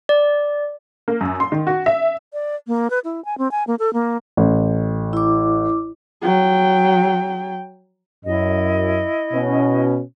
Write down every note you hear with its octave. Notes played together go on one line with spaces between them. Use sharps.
D5
A#3
F#2
C6
D#3
F#4
E5
D5
A#3
B4
E4
G#5
C4
G#5
A#3
A4
A#3
A1
E4 D6
F#3 G5
F#2 E4 D#5
B2 C#4